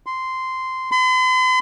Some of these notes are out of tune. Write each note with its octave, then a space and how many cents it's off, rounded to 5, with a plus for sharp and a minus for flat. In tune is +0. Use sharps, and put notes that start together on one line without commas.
C6 -10
C6 -45